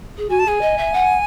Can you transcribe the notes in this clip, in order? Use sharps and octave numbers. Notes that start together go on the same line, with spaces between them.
G#4
F#4 G#5
A5
G#4 G#5
D#5
E5
F#5